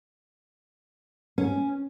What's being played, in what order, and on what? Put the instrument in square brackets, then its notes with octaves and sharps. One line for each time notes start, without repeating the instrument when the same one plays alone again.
[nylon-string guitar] C#4